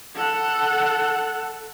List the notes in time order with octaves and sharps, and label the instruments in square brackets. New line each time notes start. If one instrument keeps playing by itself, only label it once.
[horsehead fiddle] A4 F#5